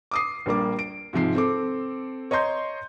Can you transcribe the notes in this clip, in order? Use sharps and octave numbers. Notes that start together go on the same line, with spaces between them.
D6 D#6 C7
A#1 G3 A#3 D6
D7
G#2 C3 F3 C7
C4 A4 D6
C#5 D#5 A#5 C6 G6